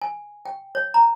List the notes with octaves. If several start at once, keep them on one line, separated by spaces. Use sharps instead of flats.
G#5
G5
C#5
A#5